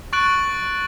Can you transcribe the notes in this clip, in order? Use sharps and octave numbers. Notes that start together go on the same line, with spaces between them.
C#6 F#6 A6 D7 F#7